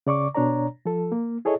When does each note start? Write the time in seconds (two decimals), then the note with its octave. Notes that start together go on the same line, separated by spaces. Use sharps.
0.07 C#3 D5 C#6 D6
0.35 B2 D4 C#5 D5 A#5
0.86 F3 A4
1.12 A#3
1.45 E4 G#4 A4 C#5 D#5